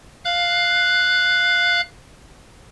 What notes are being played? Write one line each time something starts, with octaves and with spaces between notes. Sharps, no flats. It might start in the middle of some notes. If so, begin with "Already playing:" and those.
F5 F#6